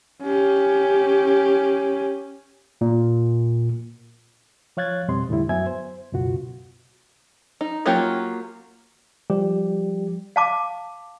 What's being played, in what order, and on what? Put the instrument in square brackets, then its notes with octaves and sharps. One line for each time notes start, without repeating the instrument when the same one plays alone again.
[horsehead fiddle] C#4 G4
[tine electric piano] A#2
[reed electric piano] F3 C#5 F5 F#6 G#6 A6
F2 B2 G3 C4 D#5 C6
E2 A2 D3 G3 E4
F#2 F#3 B3 E5 G#5 G#6
C5
C#2 F#2 B2 F4 F#4
[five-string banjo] D#4
F#3 A#3 C#4 F4 G4
[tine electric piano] F3 G3 G4
[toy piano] F5 A5 D6